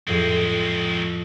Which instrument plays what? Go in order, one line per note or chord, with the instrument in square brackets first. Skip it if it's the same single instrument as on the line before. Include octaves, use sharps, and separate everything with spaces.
[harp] F2 A2 [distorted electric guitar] G#3 C4